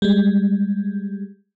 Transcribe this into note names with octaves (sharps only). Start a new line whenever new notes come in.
G3 G#3